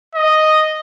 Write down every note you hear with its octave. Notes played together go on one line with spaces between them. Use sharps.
D#5